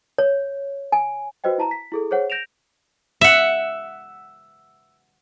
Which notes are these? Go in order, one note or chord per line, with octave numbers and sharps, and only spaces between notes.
C#5
G#5
F#4 B4 C5 D#5 G5
E4 A5 A#5
B6
E4 G#4 A4
G#4 C5 C#5 F#5
G6 A#6 D7 E7 F7
E5 F#5